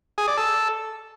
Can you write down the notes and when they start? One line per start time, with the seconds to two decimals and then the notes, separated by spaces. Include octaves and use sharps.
0.18 G#4
0.28 D5
0.37 A4